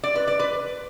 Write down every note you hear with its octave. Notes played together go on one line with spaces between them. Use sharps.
D5
B4
D5
B4